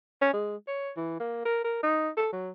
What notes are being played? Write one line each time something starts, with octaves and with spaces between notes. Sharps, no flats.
C#4
G#3
C#5
E3
A#3
A#4
A#4
D#4
A4
F#3